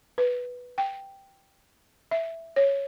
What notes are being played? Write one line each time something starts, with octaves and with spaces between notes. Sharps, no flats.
B4
G5
E5
C#5